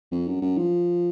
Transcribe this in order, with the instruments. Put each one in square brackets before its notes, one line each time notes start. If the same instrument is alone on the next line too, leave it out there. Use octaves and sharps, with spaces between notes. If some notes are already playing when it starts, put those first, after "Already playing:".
[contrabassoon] F2
F#2
F#2
F3